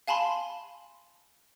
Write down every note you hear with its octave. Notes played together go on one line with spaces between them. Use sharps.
F5 G#5 A5 B5 C6